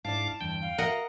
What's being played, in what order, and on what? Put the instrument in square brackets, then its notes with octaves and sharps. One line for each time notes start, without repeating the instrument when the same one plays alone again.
[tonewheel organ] G#2 F5 D6 [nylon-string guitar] D4 E4 D5 [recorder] A5
[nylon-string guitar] E2 G2 D3 [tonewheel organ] G5
[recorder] F5
[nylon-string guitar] F#4 B4 E5 [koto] A#4 D#5 F#5